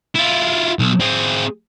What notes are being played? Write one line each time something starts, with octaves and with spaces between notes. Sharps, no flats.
E4 F4
B1
C4 G#4